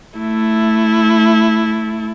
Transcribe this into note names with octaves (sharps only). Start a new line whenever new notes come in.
A3 E4